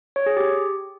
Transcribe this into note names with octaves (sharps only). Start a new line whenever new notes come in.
C#5
G#4
G4